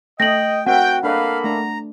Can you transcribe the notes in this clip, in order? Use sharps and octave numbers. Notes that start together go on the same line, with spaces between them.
A3 D#5 G5 A#6 F#7
C4 F#4 A#4 E5 F#5 G5
A#3 D4 A4 B4 D#5 F5 B5
A3 D4 A#5